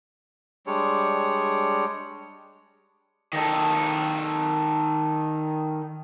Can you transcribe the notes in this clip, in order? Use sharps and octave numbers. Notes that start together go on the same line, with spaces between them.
G3 G#3 D4 C#5
D#3 A4